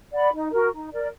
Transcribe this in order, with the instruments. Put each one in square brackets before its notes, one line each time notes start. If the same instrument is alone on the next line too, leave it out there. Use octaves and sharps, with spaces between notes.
[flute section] D5 F#5 B5
D#4
F#4 A#4
D#4
A#4 D5